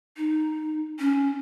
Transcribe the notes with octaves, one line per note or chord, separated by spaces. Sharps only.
D#4
C#4